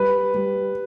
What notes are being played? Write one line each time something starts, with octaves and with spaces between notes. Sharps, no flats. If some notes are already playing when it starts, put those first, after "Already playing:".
Already playing: G3 B4
G3